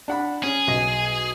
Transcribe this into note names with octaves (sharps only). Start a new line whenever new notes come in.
D4 F#5 B5
C#4 G#4
B1 D#5